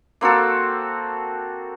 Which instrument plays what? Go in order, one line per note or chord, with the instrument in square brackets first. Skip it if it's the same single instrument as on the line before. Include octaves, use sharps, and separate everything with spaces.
[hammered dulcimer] A#3 C4 F#4 A4